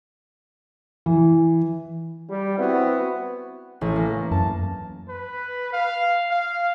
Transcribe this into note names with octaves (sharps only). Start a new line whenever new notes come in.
E3
G3
B3 C4 E4 F#4
A1
A#3
F#2 A5
B4
F5
F5